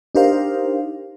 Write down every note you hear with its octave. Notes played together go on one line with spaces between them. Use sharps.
D4 D#4 G4 A#4 C5 F5